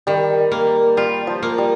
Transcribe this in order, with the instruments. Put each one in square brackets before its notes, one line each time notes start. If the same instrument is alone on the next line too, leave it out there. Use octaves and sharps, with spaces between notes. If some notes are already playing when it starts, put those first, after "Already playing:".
[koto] D#3 [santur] G3
[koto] A#3
[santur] G3 [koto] F4
[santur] F3
[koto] A#3
[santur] G3